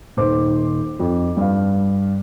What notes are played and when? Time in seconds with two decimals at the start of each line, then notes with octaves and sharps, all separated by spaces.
0.17 D#1 D#3 C5 D6
1.00 F2
1.37 G2 F5